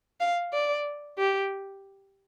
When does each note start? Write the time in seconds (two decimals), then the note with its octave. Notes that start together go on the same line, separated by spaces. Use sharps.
0.20 F5
0.53 D5
1.18 G4